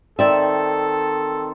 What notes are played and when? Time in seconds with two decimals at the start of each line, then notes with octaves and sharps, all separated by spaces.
0.19 D#3 C4 A4 D5 E5